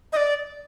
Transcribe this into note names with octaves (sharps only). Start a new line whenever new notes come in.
D#5
D5